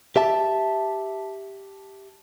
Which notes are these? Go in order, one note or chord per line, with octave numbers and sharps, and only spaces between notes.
G4 E5 A5